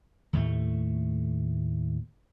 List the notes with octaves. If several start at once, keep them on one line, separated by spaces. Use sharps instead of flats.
D#2 A2 A3